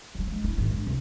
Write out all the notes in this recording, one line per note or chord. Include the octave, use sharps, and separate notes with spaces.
D#3 F#3
F3 G#3
E4
G#1 D#3
G#2 D3
C2